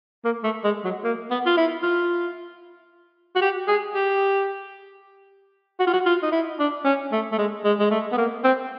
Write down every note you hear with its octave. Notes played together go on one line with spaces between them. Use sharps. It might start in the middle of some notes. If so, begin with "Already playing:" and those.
A#3
A3
G#3
F#3
A#3
B3
F4
E4
F4
F#4
G4
G#4
G4
F#4
F4
F#4
F4
D#4
E4
D4
C#4
A3
A3
G#3
G#3
G#3
A3
B3
A#3
C4